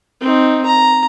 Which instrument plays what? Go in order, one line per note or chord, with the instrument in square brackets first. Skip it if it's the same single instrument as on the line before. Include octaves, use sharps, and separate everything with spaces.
[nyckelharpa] C4 D#4
A#5